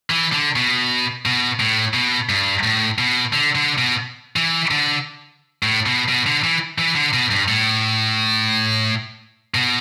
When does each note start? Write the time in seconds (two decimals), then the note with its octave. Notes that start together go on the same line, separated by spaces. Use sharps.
0.10 E3
0.33 D3
0.56 B2
1.26 B2
1.60 A2
1.94 B2
2.29 G2
2.63 A2
2.98 B2
3.33 D3
3.55 D3
3.78 B2
4.36 E3
4.71 D3
5.63 A2
5.86 B2
6.09 B2
6.27 D3
6.44 E3
6.78 E3
6.95 D3
7.13 B2
7.31 G2
7.48 A2
9.55 B2